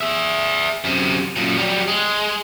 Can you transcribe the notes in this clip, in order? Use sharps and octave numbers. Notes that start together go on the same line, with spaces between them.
G#4 E5
F#2 C3
F#2 A#2
F#3 G3
G#3